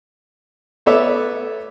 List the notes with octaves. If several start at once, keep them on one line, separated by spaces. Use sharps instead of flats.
A3 B3 A4 C#5 E5 D6